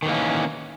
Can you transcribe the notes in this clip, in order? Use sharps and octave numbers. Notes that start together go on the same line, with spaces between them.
D#3 E3 A#3 C#4